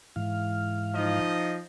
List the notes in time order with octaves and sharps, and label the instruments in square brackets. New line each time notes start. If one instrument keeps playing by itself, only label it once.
[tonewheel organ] G#2 E3 F5
[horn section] F3 D#4 D#5